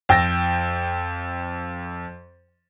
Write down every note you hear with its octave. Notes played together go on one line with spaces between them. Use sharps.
F2 G5 E6 A6 A#6